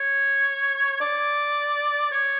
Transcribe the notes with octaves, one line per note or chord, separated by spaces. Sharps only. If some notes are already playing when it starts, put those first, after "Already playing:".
Already playing: C#5
D5
C#5